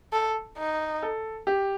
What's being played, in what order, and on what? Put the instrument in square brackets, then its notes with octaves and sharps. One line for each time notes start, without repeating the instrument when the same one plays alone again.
[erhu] A4
D#4
[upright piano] A4
G4